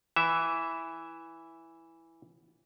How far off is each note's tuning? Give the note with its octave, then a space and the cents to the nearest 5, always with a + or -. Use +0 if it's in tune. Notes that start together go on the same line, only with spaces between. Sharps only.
E3 +0 E5 +0